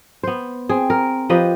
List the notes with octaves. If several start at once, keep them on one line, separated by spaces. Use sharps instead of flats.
B3 C5
C4 G#4
A#4
F3 G4 B4 D#5